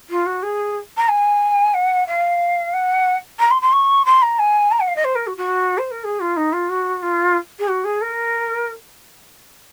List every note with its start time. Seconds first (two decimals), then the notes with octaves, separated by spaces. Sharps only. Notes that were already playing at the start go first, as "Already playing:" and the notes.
0.10 F4
0.26 F#4
0.43 G#4
0.97 A#5
1.08 G#5
1.74 F#5
2.07 F5
2.74 F#5
3.39 A#5
3.51 C6
3.62 C6
3.73 C#6
4.05 C6
4.22 A#5
4.39 G#5
4.71 A#5
4.80 F#5
4.88 F5
4.96 D#5
5.04 C5
5.15 A#4
5.27 F#4
5.37 F#4
5.78 C5
5.91 A#4
6.04 G#4
6.20 F4
6.37 D#4
6.53 F4
6.70 F#4
7.02 F4
7.59 G#4
7.68 F#4
7.84 G#4
8.01 A#4